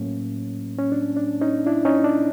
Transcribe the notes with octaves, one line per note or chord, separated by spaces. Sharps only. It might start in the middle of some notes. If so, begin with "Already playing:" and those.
Already playing: A2 F#3 A#3 C#4
C#4
D4
D4
C#4 D#4
D4 E4
C#4 D#4
D4